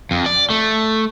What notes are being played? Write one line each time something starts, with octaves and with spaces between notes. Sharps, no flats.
F2
D5
A3